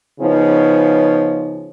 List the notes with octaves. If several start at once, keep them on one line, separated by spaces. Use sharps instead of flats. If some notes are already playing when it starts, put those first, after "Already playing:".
C#3 F3 B3 C#4 D#4